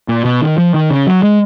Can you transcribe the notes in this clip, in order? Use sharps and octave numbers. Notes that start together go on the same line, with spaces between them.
A#2
B2
D#3
F3
D#3
C#3
F#3
G#3